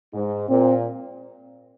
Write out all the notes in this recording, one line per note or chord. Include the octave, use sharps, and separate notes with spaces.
G#2
A#2 C4